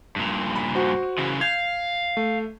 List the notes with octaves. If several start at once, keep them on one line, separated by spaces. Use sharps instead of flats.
G2 A#2
B5
F#4 C5
C#3 E3
F5 G6 G#6
A3